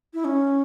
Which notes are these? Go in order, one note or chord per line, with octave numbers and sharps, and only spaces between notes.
E4
C#4